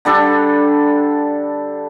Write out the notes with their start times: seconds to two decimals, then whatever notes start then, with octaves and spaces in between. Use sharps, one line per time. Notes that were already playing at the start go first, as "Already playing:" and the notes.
0.05 D3 G3 D4 A4